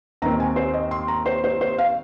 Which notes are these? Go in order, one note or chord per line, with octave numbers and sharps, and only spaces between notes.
D#2 D#3 C4 A#5
G#5
C5
D#5
C6
A#5
C5
C5
C5
F5